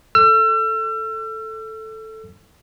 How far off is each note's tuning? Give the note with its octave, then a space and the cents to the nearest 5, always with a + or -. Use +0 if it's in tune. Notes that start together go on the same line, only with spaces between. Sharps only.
A4 +0 E6 +40